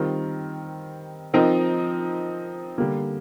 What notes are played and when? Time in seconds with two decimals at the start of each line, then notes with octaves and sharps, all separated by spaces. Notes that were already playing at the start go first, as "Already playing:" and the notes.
Already playing: D#3 G3 C4 F4 A#4
1.33 F3 C4 D#4 A#4
2.78 D3 G3 A#3